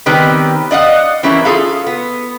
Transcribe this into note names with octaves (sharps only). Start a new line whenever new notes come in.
D#3 G3 B3 C4 G4 B4
D5 D#5 F5 F#5
E3 G3 C4 C#4 E4 A#4
F4 G#4 A4 F5
B3